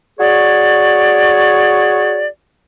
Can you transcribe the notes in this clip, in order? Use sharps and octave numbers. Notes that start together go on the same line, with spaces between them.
F#4 G#4 C#5 D5